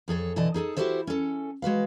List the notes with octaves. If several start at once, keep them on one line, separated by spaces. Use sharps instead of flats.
F2 G#4 A4 C#5
B2 D3 E3 D5 D#5 A5
D#4 G#4 A4 A5
E4 F#4 G4 A4 C5 D#5
C#4 A4
G#3 F#4 B4 F5